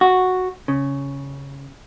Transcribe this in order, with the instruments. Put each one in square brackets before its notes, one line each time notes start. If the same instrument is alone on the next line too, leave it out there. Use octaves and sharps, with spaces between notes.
[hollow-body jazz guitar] F#4
C#3